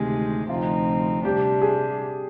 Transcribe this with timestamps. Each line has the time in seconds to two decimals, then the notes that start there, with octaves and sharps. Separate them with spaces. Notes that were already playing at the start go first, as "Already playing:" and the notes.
Already playing: D2 C3 D#3 G#3 G4
0.49 D2 C3 F3 C4 D#4 F4
1.25 C3 G3 D4 G4
1.62 G#4